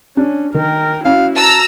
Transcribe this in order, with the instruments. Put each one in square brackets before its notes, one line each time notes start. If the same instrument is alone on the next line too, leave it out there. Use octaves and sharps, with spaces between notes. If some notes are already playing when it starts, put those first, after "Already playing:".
[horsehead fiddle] C#4 [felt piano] D4
[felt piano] D#3 [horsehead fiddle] A#4 G5
[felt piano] C#4 [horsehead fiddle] E4 F#4 [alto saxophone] F5
[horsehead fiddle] F#4 [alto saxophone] A5 [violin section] A#5 E6